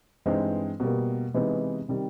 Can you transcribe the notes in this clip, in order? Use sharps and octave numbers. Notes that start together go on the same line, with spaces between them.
G2 E3 G#3 C4 D#4
B2 G3 A#3
C3 E3 G#3 B3 D#4
C3 D#3 G3